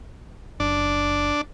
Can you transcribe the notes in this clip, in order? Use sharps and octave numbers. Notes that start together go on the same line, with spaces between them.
F#1 D4